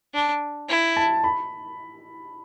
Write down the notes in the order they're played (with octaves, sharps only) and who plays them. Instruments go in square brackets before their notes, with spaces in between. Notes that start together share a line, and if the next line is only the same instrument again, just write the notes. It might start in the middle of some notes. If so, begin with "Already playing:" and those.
[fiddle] D4
E4
[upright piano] A5
B5